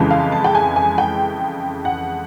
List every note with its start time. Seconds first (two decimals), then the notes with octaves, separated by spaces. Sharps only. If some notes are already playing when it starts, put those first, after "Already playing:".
Already playing: F2 C#3 E3 G#3
0.11 F5
0.32 A5
0.44 G5
0.55 G#5
0.76 G#5
0.98 G5
1.85 F#5